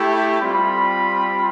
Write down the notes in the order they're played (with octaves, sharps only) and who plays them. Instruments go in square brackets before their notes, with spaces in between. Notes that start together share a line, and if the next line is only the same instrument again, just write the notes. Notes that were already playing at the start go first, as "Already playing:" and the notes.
Already playing: [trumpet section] A3 E4 G4
G3 C4 F4 B5